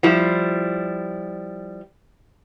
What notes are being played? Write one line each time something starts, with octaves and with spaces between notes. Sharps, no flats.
F3 G3 E4